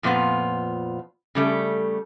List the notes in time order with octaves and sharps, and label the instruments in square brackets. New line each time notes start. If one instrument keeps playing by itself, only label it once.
[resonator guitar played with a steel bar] F2 A#2 F3 B3 F4
C#3 G3 A3